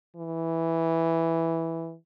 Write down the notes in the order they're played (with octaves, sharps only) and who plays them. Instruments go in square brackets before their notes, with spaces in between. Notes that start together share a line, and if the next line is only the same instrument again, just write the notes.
[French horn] E3